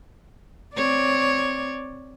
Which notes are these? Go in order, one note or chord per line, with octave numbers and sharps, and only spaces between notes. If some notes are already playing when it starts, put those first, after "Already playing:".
C4 C#5 D5